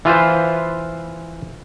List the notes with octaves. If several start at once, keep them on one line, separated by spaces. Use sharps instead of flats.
E3 F4 B4 C5